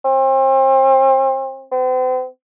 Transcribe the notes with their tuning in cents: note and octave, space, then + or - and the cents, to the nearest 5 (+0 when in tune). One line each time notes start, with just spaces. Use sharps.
C4 +35
C4 -40